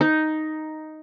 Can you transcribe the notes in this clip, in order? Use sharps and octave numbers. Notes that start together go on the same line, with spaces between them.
D#4